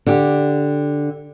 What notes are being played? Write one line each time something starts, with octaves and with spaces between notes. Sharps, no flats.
D3 G4